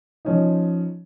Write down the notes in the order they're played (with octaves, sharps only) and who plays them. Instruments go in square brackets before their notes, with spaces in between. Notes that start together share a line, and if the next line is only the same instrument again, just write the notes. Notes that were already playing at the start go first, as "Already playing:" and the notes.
[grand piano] F3 C#4 D#4